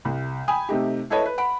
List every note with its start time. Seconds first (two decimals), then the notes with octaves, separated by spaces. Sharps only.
0.05 C2
0.48 G5 G#5 B5 D#6
0.69 C3 A3 D#4 G4
1.10 E4 A4 B4 C#5 D#5 A5
1.26 B4
1.38 F#5 B5 D7